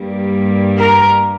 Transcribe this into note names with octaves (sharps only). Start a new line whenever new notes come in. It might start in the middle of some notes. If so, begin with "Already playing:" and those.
Already playing: G2 G3 A#3
A#4